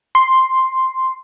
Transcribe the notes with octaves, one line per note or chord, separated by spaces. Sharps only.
C6